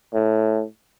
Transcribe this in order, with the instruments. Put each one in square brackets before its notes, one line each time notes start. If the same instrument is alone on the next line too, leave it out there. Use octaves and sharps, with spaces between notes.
[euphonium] A2